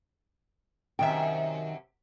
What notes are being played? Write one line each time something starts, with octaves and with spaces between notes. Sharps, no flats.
F#2 C3 D#3 E5 G5